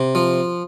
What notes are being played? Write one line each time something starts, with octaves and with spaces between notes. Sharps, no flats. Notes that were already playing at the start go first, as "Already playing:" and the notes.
Already playing: C3
F3